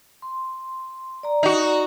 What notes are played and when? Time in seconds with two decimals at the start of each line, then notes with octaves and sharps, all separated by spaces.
0.22 C6
1.23 D5 A#5
1.43 D#4 F#4